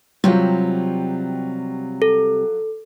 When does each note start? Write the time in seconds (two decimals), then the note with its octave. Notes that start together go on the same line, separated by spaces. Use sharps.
0.24 C3 F#3 G3 F4
2.02 A4